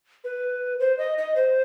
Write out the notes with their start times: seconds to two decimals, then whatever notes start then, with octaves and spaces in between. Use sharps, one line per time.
0.24 B4
0.80 C5
0.98 D#5
1.18 D#5
1.36 C5